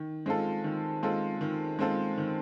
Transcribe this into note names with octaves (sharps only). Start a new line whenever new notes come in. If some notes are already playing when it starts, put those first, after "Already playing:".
Already playing: D#3
G#3 C4 F4 A4
D#3
G#3 C4 F4 A4
D#3
G#3 C4 F4 A4
D#3